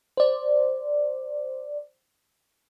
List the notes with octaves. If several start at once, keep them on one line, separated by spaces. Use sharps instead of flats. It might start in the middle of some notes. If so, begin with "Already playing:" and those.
C5 D5